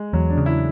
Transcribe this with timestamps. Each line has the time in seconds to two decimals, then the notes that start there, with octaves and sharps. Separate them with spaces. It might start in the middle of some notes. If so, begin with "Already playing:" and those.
Already playing: G#3
0.13 E2 F#3
0.30 D4
0.38 C#3
0.46 E4